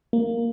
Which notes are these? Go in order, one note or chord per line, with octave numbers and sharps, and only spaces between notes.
A#3